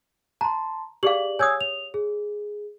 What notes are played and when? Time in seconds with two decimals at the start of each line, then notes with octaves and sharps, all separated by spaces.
0.41 A5 A#5 C6
1.03 G4 G#4 D5 F5 F#7
1.39 C#5 G#5 D#6 E6 G#6
1.61 F7
1.94 G#4